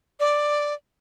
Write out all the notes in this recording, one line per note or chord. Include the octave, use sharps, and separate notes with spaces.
D5